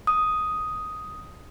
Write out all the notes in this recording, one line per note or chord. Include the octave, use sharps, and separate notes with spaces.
D#6